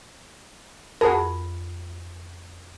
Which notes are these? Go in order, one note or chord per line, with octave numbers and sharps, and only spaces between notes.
F2 F#4 G#4 A#4 B5